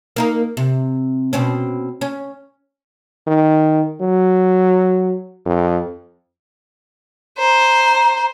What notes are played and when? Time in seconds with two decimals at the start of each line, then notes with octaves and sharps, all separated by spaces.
0.16 A#3 D#4 A#4
0.57 C3
1.33 B2 C4 C#4
2.01 C#4
3.27 D#3
4.01 F#3
5.46 F2
7.39 C5 A#5